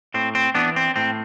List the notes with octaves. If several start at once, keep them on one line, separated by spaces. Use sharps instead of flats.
A2 C4
C4
E3 B3 D4
C4
A2 C4